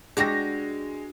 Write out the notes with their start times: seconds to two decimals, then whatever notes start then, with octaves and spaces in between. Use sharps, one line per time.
0.17 G#3 D4 F#4 G4 A#6